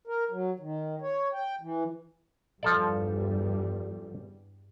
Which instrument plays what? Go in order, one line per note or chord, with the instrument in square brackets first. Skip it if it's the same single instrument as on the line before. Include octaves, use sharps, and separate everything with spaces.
[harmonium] A#4
F#3
D#3
C#5
G5
E3
[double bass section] E2 G2 G3 [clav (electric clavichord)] F3 A4 D5